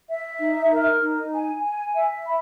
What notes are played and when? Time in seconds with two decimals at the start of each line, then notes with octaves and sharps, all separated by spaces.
0.08 E5
0.39 D#4
0.70 A#4
1.01 D#4
1.32 G#5
1.63 G#5
1.94 E5
2.26 B5